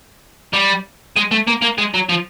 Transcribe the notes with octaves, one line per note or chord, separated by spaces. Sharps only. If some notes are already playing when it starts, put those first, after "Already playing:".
G3
G#3
A3
A#3
A#3
G#3
F#3
F3